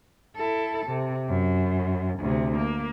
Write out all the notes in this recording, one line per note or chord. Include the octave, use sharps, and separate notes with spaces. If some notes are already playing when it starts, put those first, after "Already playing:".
E4 A4
C3
F#2
D2 C3
A#3